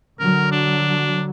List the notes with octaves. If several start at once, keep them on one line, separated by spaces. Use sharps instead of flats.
D3 F#3 A#4
D4